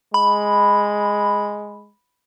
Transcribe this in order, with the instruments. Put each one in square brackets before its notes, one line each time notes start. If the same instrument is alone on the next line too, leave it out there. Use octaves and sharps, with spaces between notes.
[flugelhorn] G#3 [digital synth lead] B5